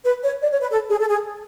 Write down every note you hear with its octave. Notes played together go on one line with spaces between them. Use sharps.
B4
C#5
D5
C#5
B4
A4
G#4
A4
G#4